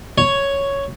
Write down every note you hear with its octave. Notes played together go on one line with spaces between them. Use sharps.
C#5